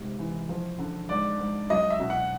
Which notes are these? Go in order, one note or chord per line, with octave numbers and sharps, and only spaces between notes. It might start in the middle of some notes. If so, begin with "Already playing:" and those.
Already playing: G#2 C3
E3
F3
D3
G#2 D5
G#2
F#3 D#5
E5
B2
F#5